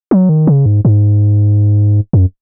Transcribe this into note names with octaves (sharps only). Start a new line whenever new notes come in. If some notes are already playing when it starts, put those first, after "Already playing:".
F#3
D#3
C#3
G#2
G#2
F#2